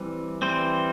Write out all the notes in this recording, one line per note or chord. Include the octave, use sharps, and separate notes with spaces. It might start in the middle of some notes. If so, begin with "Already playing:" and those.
Already playing: E3 G3 C4
E3 G3 C4 C5